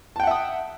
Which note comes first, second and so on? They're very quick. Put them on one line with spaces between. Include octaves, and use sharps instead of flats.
A5 G5 F#5 E5 D#6